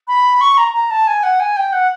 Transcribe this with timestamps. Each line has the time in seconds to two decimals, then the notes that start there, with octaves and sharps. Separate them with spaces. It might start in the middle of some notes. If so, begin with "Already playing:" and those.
0.08 B5
0.41 C#6
0.57 A#5
0.74 A#5
0.90 A5
1.07 G#5
1.23 F#5
1.40 G#5
1.57 G5
1.73 F#5